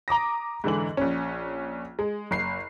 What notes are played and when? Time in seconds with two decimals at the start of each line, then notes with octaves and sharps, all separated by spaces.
0.08 A#5 D6 D#6 A#6
0.64 G#2 D3 E3 F#7
0.97 A#1 C#4
1.99 G#3
2.31 F#1 C7